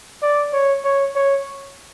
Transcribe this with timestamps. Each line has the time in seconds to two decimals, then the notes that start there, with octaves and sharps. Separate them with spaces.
0.22 D5
0.53 C#5
0.84 C#5
1.15 C#5